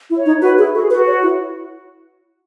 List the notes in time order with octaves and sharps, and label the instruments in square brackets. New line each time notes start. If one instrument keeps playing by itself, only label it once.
[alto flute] E4
[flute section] C#5
[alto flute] D#4
[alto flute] F#4 [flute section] B4
[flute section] E4 [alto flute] G#4
[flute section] F#4 [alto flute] A4
[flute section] G#4
[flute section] F#4 [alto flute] B4
[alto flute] C#5
E4